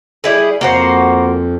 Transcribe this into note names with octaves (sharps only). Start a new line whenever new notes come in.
G3 E4 G#4
F2 A#3 F#4 C5